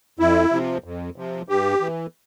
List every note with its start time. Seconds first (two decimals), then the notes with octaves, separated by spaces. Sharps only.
0.19 F2 E4
0.52 C3 F3
0.84 F2
1.16 C3 F3
1.48 G2 G4
1.81 E3